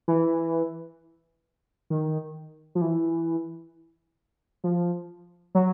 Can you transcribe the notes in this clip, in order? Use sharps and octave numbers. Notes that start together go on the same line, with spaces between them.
E3
D#3
F3
E3
F3
F#3